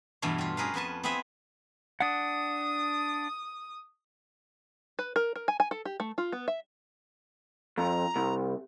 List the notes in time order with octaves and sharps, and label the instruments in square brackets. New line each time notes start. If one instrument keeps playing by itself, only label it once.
[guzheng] E2 G2 B2 E3 A3 F5
G3 F4
C#4 G#4 A#4 B4 F5
F2 B3 B4 G#5 A5
B3 C4 E4 G#4 B4 E5
[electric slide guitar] D4 F#5 [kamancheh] D#6
[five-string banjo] B4
A#4
A#4
G#5
G#5
A4
G4
A3
F4
B3
E5
[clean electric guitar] F2 [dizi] A#5
[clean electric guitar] C2